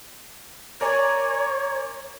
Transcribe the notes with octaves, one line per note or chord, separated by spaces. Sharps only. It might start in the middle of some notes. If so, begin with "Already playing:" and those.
A#4 C#5 D5 G#5